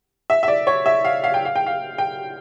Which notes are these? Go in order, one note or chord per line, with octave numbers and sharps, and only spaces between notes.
E5
E5
D5
C#5
E5
F5
F5
G5
F5
G5
F5
G5